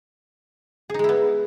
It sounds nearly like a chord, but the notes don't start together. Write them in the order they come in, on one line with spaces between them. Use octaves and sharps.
G#4 D#4 G#3 E4 B3